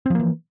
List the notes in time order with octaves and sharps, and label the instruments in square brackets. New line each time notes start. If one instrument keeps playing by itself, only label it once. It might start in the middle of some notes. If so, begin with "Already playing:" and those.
[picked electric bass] C4
F3
A#3
E3